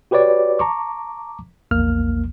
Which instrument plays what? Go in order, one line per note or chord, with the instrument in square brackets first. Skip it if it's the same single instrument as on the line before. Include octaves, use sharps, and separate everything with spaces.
[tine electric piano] F#4 G4 B4 C#5 D5
A5 A#5 C#6 D6
A#1 E2 A#3 F6